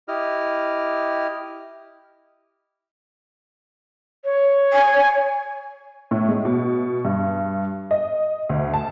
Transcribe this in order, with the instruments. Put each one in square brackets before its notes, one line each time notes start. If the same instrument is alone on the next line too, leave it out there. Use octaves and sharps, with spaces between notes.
[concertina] E4 G4 D#5 F6
[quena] C#5
[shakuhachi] G#5
[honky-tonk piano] A2
G#3
B2
G2
D#5
D2
A5